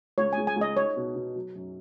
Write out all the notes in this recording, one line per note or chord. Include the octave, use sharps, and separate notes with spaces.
C#2 C#5
G#5
C#2
G#5
C#2 D#5
D#4 C#5
B2
B2
F#3
F#2